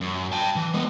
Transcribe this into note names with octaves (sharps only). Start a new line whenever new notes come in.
F#2
G5 A5
E3
G#3 B3